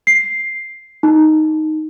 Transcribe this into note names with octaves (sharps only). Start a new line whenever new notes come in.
C7
D#4